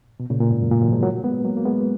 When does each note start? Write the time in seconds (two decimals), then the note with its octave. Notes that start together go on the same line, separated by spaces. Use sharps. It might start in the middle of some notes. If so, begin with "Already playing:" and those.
0.20 B2
0.30 A#2 C#3
0.40 A#2
0.51 G#2
0.61 F#2
0.72 A#2
0.82 D#3 F#3
0.92 F3 G#3
1.03 F#3 A#3
1.24 G#3 B3
1.44 F#3 A#3
1.57 A#3
1.65 G#3 B3